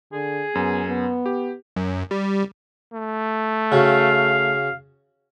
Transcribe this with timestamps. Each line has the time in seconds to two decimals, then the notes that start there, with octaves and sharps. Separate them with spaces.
0.13 D3 G#4
0.55 F#2 B3
0.87 B3
1.26 G4
1.76 F#2
2.11 G3
2.93 A3
3.72 C#3 F#4 F5